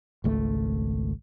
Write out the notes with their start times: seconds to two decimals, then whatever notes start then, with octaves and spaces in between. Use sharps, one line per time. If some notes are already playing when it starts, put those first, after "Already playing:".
0.24 G#1 C#2 A3